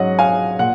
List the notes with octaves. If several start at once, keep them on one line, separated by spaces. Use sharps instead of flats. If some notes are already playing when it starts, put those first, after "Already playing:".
Already playing: G#2 F#3 C#4 D#5 F#5
F5 G#5
A#2 F#5